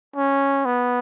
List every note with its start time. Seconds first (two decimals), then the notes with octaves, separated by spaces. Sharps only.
0.16 C#4
0.65 B3